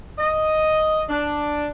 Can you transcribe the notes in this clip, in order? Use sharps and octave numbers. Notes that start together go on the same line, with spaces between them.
D#5
D4